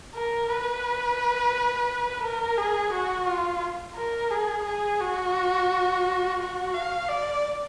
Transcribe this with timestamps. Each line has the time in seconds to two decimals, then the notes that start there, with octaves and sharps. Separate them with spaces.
0.15 A#4
0.49 B4
2.23 A#4
2.58 G#4
2.93 F#4
3.27 F4
3.96 A#4
4.31 G#4
4.65 G#4
5.01 F#4
6.40 F#4
6.74 F5
7.09 D5